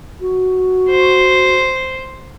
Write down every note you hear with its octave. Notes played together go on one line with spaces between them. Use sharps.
F#4
C5